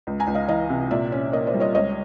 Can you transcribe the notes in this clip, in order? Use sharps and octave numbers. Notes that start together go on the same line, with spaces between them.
C#2
G#5 A#5
C#2
D#5 F5
E3 D#5 F5
C3
A#2 D5 E5
C#4
A#3 C#5 D#5
C5 D5
G3
C#5 D#5
C#2 C#5 D#5